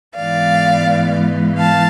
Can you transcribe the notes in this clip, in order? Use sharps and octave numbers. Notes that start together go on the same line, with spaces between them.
G#2 E3 G#3 B3 D5 F5
F5 A5